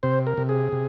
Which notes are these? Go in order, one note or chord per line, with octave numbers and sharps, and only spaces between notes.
C3 C5
A#4
C3
G#4
C3